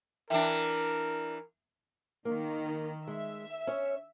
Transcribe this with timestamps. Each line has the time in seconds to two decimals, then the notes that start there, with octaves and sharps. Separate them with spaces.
0.30 E3 D4 A#4 E5 G5
2.25 D#3 A#3
3.08 G#3 E5
3.67 C#4 C#5